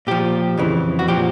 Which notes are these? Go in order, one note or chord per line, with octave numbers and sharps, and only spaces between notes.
A#2 F3 G4
F2 C#3 E3
F#4
A#2 F3 G4